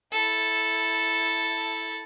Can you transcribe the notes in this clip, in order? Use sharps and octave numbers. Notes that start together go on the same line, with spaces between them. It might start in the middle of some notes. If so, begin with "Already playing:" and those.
E4 A4